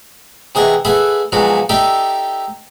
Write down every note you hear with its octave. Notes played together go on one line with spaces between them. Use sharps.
C3 E3 G#4 D#5 F#5 C#6
G#4 A4 B4 E5 F#5
A#2 F3 F#3 G#3 B3 F#4
D#4 G4 A4 D5 E5 G5